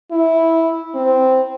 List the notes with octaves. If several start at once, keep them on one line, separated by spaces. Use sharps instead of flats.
E4
C4